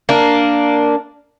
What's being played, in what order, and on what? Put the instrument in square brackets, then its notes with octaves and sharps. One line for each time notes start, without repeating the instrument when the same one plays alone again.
[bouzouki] A#3 D4